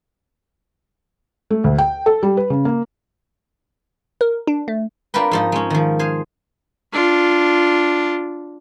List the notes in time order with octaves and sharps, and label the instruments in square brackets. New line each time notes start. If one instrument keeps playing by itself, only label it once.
[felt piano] A3
D2
G5
A4
G3
B4
C#3
A#3
[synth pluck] A#4
D4
A3
[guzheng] D4 F4 G4 A#4 B4
G#2 F3 D#4
G#3 C#4
D#3 F3
G#4 C5 F5
[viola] D4 F4